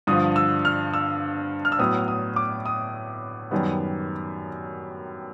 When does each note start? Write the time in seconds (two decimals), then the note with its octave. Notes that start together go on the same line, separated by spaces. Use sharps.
0.07 G2 D3 F3 D#6
0.36 E6
0.65 F6
0.93 E6
1.65 F6
1.72 E6
1.79 A2 F#3 B3 D#6
2.08 D#6
2.36 D6
2.66 D#6
3.51 F#2 D#3 G3 B3